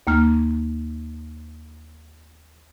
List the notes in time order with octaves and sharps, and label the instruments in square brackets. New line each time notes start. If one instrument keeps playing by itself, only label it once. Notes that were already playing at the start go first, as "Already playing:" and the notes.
[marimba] D#2 A#3 F6